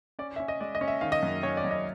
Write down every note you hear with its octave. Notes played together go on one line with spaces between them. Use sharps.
C#4 D5
C#4 E5
D#5
G#3 D5
D#5
C#4
E5
D#3 F5
D#5
F#2
C#4 C#5
D5
F#2
D#5